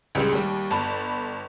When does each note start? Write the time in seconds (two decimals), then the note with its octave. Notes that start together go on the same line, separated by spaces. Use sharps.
0.15 C#2 G3 G#3
0.32 D#2 G3
0.71 G1 A5 B5